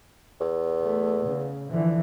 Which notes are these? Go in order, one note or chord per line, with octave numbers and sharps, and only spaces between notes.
E2
A3
C#3
D3 E3 F3